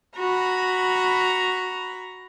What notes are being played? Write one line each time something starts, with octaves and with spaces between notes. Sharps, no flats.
F#4 A#5 B5